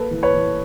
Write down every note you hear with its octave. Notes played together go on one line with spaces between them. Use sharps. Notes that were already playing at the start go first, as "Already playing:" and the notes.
Already playing: A#3 A4 B4
E3
B4 C#5
E3